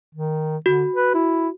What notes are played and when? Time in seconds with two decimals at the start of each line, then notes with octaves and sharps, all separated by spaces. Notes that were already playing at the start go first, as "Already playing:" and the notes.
0.15 D#3
0.66 D3 F#4
0.96 B4
1.14 E4